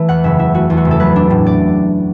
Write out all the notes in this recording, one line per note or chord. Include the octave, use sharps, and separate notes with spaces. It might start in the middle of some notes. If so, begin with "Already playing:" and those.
Already playing: E3 A3
E2 F#5
F#1 E5
E3 E5
A3 F#4
E2
F#4
F#1
A4
F#3 B4
D4
A2
D5